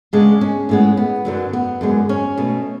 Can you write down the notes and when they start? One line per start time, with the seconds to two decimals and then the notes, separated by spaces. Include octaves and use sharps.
0.13 C#3 G#3 B3 D4
0.41 C#4
0.69 A2 G#3 B3
0.97 B3
1.25 F#2 D3 F#3
1.53 B3
1.81 F#2 D3 G#3 B3
2.09 C#4
2.38 B2 A3